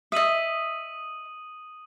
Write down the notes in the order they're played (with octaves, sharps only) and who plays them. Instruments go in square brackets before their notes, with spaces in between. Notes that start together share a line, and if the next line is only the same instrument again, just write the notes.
[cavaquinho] D#5 E5 [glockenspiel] D#6 D#7 F#7